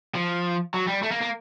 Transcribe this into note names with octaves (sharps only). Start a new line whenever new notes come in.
F3
F#3
G3
A3
A#3
A#3